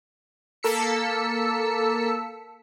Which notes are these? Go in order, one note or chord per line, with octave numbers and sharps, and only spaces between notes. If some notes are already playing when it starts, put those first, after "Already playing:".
A#3 A4 E6 B6 C#7